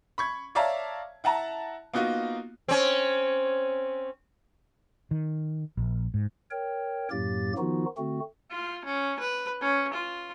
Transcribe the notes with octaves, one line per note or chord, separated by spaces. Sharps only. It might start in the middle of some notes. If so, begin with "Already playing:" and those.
B5 C#6 G#6
C#5 D5 E5 F5 A5 A#5
E4 F#5 A5 A#5
A#3 B3 D#4 F4 F#4
C4 C#4
D#3
A#1
G#2
A#4 C#5 G5
F#2 A2 F#3 A#3 G4 A6
D#3 F3 B3 D#4 F4 F#4
D3 A3 C4 F#4
F4
C#4
B4
C#4
F4